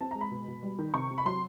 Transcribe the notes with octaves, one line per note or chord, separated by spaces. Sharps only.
C4 A5
G#3 A#5
B5
B2
B2
G3
D#3
C3 C#6
C3
B5
F#3 C6